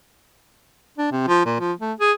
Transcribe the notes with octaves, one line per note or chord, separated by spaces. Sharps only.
D4
C3
F3
A#2
F3
A3
G#4